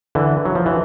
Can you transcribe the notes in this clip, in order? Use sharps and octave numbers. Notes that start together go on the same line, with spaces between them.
D3 E3
F#3
F3
E3